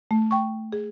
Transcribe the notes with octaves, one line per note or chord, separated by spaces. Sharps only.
A3
G5 C#6
G#4